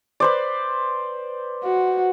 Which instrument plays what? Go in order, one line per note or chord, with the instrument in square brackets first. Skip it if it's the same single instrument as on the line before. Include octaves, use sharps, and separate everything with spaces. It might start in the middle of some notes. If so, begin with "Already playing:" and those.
[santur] B4 C5 D5
[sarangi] F#4